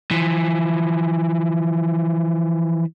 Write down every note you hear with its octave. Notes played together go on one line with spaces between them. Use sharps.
E3 F3